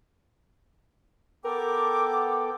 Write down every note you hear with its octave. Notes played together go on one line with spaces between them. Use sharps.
B3 A4 A#4 G5 D6